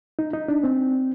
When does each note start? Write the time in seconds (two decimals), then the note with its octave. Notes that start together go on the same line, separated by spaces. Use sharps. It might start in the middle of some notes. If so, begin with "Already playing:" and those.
0.19 D#4
0.33 D#4
0.48 D4
0.63 C4